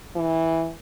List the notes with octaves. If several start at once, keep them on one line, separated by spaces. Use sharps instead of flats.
E3